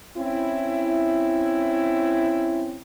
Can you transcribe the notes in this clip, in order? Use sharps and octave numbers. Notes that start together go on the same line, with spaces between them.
C4 C#4 E4